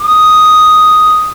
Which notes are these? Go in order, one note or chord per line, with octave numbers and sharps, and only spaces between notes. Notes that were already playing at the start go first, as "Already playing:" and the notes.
D#6